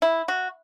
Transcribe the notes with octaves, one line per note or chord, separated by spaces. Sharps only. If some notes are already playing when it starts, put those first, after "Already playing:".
E4
F#4